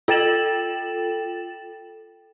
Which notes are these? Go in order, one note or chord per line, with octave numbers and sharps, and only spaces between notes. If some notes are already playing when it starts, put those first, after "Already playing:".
F4 A4 G5 A6 E7 F#7